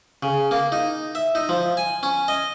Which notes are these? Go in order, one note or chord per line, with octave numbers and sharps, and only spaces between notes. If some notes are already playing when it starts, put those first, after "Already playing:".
C#3
A#3
D#4
E5
D#4
F3
G#5
C#4
D#5